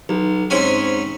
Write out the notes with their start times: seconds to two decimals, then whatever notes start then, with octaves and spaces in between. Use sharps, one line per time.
0.09 B1
0.50 G#2 C4 C#4 C#5 G#5 B5